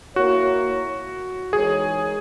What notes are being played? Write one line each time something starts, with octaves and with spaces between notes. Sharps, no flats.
A#3 E4 F#4 A#4 C#5
E3 G#3 D#4 G#4 A#4 C#5